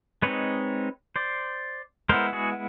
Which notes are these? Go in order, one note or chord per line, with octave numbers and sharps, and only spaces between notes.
G#3 C4 D#4 B4 C#5
C5 D5
G#3 B3 E4 A#4 C5
F#4 G#4